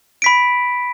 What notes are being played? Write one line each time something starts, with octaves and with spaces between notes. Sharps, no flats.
B5 B6 D7